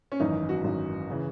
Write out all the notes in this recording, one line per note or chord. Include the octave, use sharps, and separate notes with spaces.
C#4
G#1 F#2 E3 D#4
F#4
G#1 F#2 E3
C#3 E3